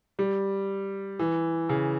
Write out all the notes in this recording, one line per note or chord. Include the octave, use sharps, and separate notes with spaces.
G3
E3
C#3